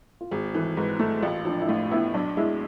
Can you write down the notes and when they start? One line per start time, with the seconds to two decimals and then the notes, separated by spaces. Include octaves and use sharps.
0.21 F4
0.31 G#1 G#4
0.54 E3 A4
0.77 G#2 B4
0.99 A3 A4
1.22 A1 F4
1.45 F3 D4
1.61 E4
1.69 A2 F4
1.91 B3 E4
2.14 B1 D4
2.37 G#3 E4